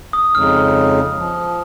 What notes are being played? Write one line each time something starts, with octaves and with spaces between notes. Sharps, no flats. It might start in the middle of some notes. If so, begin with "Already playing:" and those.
D#6
F2 C#3 G#3 D#4 F6
F3